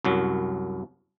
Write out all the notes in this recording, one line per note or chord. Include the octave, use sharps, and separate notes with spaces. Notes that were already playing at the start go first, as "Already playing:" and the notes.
C2 F#2 F#3